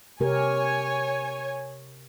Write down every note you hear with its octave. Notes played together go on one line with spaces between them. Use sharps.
C3 G4 A#4 C#5 G#5